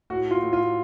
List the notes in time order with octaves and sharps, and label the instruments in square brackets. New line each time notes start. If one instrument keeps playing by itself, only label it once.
[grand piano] A2 F#4
F4
A2
F4